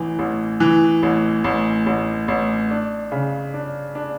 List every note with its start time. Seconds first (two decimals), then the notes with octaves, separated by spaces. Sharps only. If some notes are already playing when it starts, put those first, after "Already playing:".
Already playing: A1 E3
0.19 A1
0.60 E3
1.03 A1
1.44 A1
1.86 A1
2.28 A1
2.71 D4
3.12 C#3
3.54 D4
3.95 D4